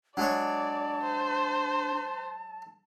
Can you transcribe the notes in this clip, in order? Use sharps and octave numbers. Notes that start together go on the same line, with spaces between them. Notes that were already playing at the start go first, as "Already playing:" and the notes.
F#3 G#3 D4 C#5 D5 A5
C5